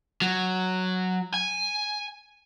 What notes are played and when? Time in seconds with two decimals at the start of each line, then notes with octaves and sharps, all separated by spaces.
0.22 F#3
1.34 G#5